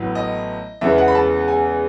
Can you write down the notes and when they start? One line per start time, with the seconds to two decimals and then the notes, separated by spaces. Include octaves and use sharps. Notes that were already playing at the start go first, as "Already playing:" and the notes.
Already playing: A1 A2 F#3 B3
0.15 D#5
0.81 E2 C#3 G#3 B3 E5
0.98 F#5
1.08 B5
1.15 A5
1.48 G#5